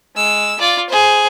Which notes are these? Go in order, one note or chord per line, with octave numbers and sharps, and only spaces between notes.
G#3 E6
F4 D5
G#4 C5